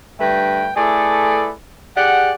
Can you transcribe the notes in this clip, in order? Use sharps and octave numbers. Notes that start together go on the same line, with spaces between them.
G2 D3 A3 B4 G5
A3 E4 G#4 A4 B4 D5
G4 G#4 D5 F#5